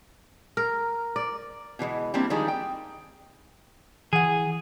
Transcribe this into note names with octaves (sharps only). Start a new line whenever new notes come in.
A#4
D5
B2 E3 F#3 G#3
G3 A#3 C4 D4 E4
D#3 F3 G3 G#3 D4 D#4
G5
E3 G#4 F#5